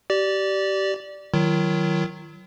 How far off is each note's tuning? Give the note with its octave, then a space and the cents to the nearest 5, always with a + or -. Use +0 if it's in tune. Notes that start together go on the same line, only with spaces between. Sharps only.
G4 -25 D5 +0
D#3 +0 F#3 +0 F4 -45